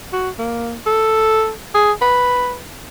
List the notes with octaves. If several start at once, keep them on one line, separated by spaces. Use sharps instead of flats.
F#4
A#3
A4
G#4
B4